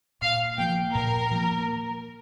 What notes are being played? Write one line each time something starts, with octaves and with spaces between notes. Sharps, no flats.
A#2 F5
F3 A#3 G5
A#2 A#4
F3 A#3